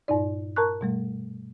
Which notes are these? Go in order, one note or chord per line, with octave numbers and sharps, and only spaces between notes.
G2 A#2 D#4 D5
A#4 A5 A#5 C#6 F#6
B2 G3 A3